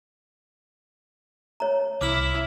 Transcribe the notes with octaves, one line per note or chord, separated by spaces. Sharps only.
C#5 A#5
C2 E4 D6 F6 F#7